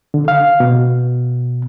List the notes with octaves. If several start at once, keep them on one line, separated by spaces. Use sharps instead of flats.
D3
F5
B2